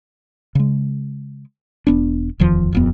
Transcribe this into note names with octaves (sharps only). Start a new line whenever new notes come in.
C#3 G#3
E1 B3 D4
D1 E2 D#3 F3
D#1 F2 B3